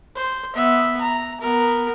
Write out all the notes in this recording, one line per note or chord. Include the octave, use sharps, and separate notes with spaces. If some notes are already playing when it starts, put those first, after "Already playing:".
C5
B3 E5
A#5
B3 A#4